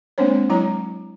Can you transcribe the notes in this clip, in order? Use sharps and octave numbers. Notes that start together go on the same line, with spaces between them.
G#3 A#3 C4 D4 C5 C#5
F#3 G#3 E4 C#5 A#5